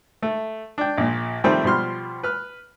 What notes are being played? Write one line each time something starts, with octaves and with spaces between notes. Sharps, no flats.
A3
D4 G5
A#1 A#2
D#3 F3 G3 A3 C4
B2 F3 G3 C6 F6
B4 F6